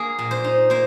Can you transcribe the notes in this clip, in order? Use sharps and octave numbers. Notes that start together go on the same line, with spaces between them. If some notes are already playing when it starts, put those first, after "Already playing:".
Already playing: A#3 G#4
A#2
C5
D#4
A#3 C5